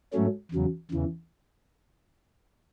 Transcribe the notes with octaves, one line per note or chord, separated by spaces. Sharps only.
G#2 F#3 A3 C#4
E2 C#3 F#3
E2 C#3 E3